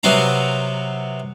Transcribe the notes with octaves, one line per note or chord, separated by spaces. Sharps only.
C3 F#3 B3 C4 F5 A#5